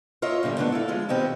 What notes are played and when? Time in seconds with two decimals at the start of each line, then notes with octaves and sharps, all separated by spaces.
0.22 F4 A#4 C#5 D#5 E5
0.43 G2 A#2 D3 G3
0.57 G#2 D3 A3 B3 D4
0.72 E4 A4 F5
0.88 F3 G#3 F4
1.09 B2 D#3 B3 C4 G4